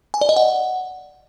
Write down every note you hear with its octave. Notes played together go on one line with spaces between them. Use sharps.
G#5
D5
D#5
F#5